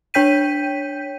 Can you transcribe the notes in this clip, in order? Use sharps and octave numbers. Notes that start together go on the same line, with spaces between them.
D4 C#5 G5 G6 B6 D#7